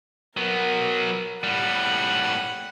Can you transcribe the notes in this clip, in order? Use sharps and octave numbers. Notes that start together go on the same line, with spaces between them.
F#3 B3 A#4
A2 G3 F#5 B5